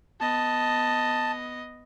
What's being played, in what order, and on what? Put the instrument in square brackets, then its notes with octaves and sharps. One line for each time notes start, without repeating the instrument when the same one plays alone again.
[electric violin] B3 D#5 [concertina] A5